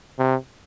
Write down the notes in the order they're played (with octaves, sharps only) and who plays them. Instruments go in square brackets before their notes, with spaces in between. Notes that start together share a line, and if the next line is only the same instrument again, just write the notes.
[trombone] C3